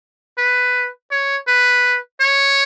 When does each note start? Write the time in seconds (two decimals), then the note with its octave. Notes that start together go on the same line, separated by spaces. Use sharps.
0.38 B4
1.11 C#5
1.48 B4
2.21 C#5